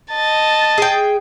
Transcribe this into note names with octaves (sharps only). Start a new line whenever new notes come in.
D#5 A5 A6
G#4 G5